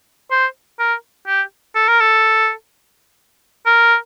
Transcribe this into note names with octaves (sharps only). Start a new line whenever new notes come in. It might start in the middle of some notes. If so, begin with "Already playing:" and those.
C5
A#4
G4
A4
A#4
A4
A#4